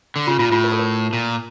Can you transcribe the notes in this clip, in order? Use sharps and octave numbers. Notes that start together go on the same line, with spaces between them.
D3
C#3 F4
A#2 F4
A2 F4
A#4
A4
A#4
A#2